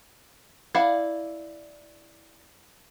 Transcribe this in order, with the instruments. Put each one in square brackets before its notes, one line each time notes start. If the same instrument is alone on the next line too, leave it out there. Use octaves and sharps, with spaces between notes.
[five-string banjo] E4 D5 F5 F#5